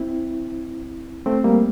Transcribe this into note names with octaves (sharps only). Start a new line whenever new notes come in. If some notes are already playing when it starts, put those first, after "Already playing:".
Already playing: C4 E4
A3 C4
G3 A#3